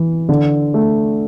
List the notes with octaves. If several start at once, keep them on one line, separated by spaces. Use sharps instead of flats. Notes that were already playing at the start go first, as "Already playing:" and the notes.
Already playing: E3
D3
A3